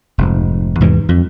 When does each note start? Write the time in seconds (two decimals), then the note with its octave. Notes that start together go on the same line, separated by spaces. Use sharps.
0.18 F1 G#2
0.80 E2 G#2 C3 E3
1.09 F2